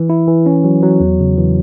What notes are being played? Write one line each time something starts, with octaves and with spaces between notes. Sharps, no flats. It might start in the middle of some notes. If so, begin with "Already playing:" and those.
Already playing: E3
E4
E3
C#4
F#3
F#3
E2
C#3
E3